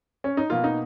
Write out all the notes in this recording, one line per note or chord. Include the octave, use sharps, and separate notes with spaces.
C#4
D#4
B2 A#3 F4
D#4